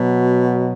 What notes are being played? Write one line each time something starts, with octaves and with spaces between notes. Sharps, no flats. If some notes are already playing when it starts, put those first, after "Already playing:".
Already playing: B2 F#3